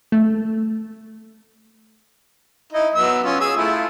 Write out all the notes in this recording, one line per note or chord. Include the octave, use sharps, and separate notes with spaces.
A3
D#4 E4 D#5
F#3 B3 E6
C#4 F4
G#4 G#5 E6
A3 E4 F4